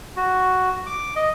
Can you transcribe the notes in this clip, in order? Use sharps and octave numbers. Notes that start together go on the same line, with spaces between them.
F#4
D6
D#5